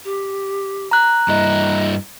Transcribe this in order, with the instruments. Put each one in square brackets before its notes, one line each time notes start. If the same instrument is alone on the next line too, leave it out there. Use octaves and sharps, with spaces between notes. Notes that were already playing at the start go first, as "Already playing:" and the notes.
[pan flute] G4
[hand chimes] A#5 F#6
[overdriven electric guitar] G2 E4 [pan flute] D#5